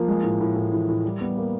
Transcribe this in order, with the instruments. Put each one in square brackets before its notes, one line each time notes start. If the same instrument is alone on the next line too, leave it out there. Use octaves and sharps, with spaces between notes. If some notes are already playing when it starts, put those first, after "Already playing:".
Already playing: [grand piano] F3 A#3
G#3
A2
A2
A2
E3
A2
G3
G3 B3
A#3